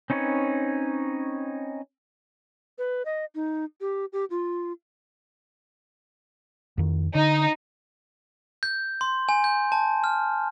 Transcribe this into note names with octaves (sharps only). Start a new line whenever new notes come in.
C4 C#4 D#4 B4 C#5
B4
D#5
D#4
G4
G4
F4
F2 D#3
D3 D#4
G6
C6
G#5
G6
A5
F6